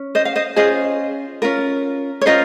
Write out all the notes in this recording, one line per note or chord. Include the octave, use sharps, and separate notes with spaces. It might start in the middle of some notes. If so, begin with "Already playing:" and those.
Already playing: C#4
C5 D#5
F5
C5 D#5
C#4 F4 G#4 C5 D#5
C#4 F4 A#4
C#5
C#4 F4 A#4 C5 D#5